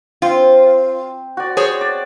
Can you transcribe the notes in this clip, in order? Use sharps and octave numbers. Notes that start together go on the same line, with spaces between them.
C4 F4
F#4 D5
G#4 C5 C#5
D5